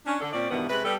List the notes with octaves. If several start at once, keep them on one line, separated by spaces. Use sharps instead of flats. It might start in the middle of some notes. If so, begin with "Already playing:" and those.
C#4 D4
D3 D4 A4
A#2 C4 C#4 D5
G2 B2 D#3 E3 G3 B3
C3 G#3 C#4 B4
G3 B3 A4